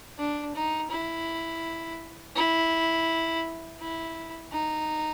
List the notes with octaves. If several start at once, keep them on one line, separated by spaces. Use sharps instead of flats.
D4
D#4
E4
E4
E4
D#4